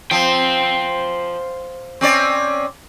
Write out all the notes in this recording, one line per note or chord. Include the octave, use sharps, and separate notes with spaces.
F3 C5 G5
C4 C#4 D5